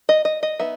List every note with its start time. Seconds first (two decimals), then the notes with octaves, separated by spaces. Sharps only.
0.09 D#5
0.25 D#5
0.43 D#5
0.60 B3 D#4 E5